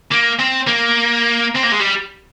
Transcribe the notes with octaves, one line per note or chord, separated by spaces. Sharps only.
A#3
C4
A#3
C4
A#3
G#3
G3